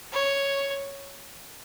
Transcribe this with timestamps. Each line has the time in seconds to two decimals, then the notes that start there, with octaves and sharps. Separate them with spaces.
0.12 C#5